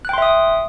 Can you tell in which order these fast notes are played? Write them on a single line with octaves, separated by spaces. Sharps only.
F#6 G5 C6 E5 D#6